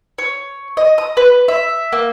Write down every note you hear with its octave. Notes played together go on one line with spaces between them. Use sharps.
C#5
D#5
D#6
B4
E5
A#3